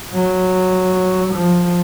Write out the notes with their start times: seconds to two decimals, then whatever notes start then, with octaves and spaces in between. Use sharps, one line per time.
0.13 F#3
1.35 F3